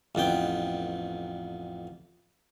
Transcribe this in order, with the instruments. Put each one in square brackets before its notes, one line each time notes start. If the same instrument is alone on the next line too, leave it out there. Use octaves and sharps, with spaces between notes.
[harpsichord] A1 F2 B3 G5